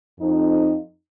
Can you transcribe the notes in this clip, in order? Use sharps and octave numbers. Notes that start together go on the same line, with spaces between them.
F2 D#4